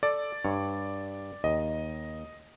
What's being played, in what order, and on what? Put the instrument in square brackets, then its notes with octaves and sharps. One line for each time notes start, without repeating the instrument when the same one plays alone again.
[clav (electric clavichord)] A4 [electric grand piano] D5
[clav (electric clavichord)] G2 C#5
[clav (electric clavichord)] D#2 [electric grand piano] D#5